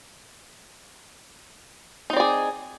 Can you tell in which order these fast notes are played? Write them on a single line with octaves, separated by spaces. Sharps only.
D#4 C4 D5 G#4